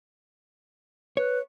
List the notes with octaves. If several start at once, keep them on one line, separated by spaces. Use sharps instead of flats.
B4 C#5